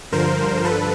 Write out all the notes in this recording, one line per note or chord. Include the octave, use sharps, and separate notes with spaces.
G2 D3 F3 A#4 C5
A4 B4